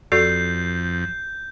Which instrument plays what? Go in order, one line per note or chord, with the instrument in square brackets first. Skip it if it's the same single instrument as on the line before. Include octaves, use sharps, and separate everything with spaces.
[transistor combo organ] F2 [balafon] F#4 A4 D5 [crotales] G6 [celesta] C7